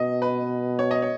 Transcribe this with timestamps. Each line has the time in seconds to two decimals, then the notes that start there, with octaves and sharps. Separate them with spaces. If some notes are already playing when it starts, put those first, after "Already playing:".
Already playing: B2 D#5
0.22 B4
0.79 C#5
0.91 D#5
1.02 C#5